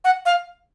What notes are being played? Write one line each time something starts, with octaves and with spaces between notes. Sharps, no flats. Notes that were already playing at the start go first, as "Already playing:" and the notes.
F#5
F5